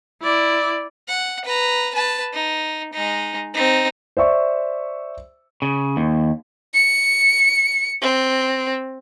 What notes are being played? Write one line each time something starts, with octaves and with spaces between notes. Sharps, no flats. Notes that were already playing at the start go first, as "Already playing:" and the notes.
E4 D5
F#5
B4 A#5
B4 A5
D#4
G#3 D#4
C4 D#4
C5 D5 E5 C#6
C#3
D#2
C#7
C4